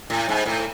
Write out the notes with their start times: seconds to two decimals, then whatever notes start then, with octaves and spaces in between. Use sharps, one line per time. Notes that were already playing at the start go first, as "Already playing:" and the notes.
0.10 A2
0.29 G#2
0.46 A2